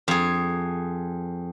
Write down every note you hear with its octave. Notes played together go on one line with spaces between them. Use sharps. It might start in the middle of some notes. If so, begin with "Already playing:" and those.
F2 G#4